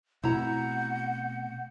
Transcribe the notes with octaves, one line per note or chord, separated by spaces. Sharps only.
B2 A3 C4 E4 F#5 A#5 G6